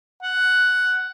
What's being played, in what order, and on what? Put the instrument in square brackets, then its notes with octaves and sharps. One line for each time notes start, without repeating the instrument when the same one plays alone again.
[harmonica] F#5